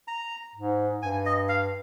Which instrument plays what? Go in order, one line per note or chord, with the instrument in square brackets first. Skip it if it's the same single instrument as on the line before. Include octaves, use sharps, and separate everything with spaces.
[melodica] A#5
[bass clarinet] G#2
[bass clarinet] G2 [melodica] G#5
[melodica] D#5
F5